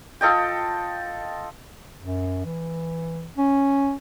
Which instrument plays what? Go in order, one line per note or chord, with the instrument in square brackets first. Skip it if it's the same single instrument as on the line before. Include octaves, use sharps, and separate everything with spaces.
[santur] F4 A4 D#5 G5
[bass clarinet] F#2
E3
C#4